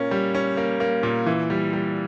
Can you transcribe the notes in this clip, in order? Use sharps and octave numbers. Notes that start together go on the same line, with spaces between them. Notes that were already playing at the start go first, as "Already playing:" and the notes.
Already playing: A#2 A#3 C#4
G3
C#4
A#3
A#3
A#2
E3
G3
G3